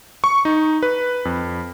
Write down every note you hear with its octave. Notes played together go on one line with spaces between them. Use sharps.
C#6
D#4
B4
F2